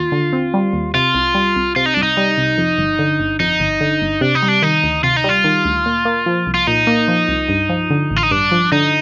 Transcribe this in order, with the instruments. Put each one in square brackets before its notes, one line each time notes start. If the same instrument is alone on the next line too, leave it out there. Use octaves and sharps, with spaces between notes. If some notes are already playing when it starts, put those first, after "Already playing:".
Already playing: [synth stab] D#2 [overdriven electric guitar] F4
[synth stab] D3
C4
G3
D#2
[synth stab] C3 [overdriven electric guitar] F4
[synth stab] C2
G3
C2
[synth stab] C3 [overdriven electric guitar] F4
[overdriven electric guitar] D#4
[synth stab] C2 [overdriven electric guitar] D4
[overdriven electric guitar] D#4
[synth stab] G3
C2
F2
G1
D3
G1
[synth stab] F2 [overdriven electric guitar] D#4
[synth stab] G1
D3
G1
[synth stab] C3 [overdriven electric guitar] D4
[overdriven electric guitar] D#4
[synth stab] G3
[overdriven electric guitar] D4
[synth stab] D#3 [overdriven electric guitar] D#4
[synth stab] D2
[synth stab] C3 [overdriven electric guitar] F4
[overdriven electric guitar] D#4
[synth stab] G3 [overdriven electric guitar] F4
[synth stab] D#3
D2
A#2
A#3
F3
C2
[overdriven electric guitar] F4
[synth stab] A#2 [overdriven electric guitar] D#4
[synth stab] A#3
F3
C2
G2
F3
D3
A1
[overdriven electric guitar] F4
D#4
[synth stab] G2 [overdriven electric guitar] D4
[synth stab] F3
[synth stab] D3 [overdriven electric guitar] D#4